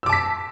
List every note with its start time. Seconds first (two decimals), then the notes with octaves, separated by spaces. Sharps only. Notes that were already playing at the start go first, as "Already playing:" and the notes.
0.03 E6
0.06 D6
0.09 A5
0.13 B6